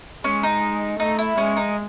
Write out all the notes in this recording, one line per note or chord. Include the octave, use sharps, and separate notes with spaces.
G#3 C#4
D#4
A3 D#4
E4
G#3 C#4
D#4